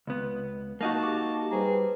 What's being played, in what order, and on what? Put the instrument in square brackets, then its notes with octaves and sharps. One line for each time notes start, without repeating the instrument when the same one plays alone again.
[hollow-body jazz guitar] C#2 B3
[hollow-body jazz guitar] A#3 D#4 F#4 [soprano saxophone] A5
[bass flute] G4 [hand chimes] C#6 D6
[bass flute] G3 [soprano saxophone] G#4 [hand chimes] B4 C5 A#5